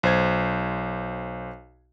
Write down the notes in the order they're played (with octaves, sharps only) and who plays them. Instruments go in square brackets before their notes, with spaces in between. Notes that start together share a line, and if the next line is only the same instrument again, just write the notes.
[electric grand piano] B1 C5 G#6